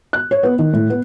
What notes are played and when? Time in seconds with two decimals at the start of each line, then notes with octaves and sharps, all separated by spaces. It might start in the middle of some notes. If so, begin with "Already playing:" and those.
0.13 F#6
0.31 C#5
0.43 B3
0.59 D#3
0.73 A2
0.90 B3